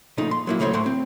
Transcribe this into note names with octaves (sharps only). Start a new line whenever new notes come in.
A#2 C#3 F3 A3 D#4
C6
F#3 A#3 E4
C#2 C#3 F#3 A3 C5 C#5
A2 A3 F#5 C6
C4